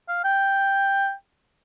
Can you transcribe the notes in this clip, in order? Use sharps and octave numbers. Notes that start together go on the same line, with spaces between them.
F5
G5